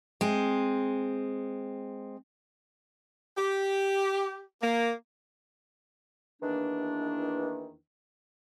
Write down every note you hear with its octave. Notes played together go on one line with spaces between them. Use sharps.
G#3 C4
G4
A#3
E2 D#3 E3 A#3 D4